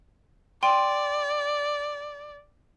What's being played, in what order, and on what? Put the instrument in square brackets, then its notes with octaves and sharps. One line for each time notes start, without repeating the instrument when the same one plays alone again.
[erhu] D5 [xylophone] G5 C6 D#7